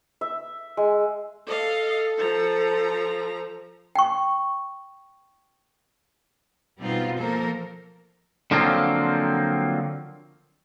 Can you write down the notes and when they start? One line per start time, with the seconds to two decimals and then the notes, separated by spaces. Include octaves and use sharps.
0.21 E5
0.77 G#3
1.47 A4 D#5 F5
2.18 F3 A#5
3.95 G5 C#6
6.80 B2 G3 B3 C4 D#4 F4
7.19 F3 A#3 A4 A#4 C5
8.51 D3 F3 F#3 A#3 C4 F4